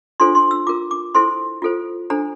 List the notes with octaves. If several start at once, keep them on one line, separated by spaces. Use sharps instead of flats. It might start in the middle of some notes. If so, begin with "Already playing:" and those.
D4 F4 A4 C5 C6
C6
E6
F4 A#4 D6
D6
E4 A4 C5 C6
F4 A4 C5
D4 A4 C5 A#5